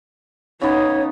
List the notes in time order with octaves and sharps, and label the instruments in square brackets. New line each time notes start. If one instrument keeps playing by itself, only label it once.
[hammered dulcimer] C#3 B3 [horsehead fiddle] D#4 [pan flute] C#5